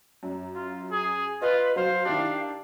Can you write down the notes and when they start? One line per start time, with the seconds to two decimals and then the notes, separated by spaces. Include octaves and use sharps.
0.23 F#2
0.55 F4
0.91 G#4
1.42 F4 B4 D#5
1.76 F#3 C5 F5
2.05 D#3 D4 E4 G4